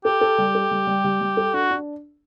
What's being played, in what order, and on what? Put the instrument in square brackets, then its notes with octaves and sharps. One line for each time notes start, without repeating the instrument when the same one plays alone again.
[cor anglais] G4 [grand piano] A4
[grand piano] A4
G3
A4
G3
G3
G3
G3
A4
[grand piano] D4 [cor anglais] F#4
[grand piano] D4